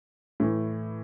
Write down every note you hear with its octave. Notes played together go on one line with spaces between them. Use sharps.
A2 E3